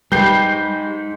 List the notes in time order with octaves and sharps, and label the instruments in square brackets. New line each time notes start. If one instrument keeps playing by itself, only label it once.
[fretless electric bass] G3 [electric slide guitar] D#4 G#4 [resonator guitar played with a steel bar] G4 B4 [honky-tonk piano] G6 C7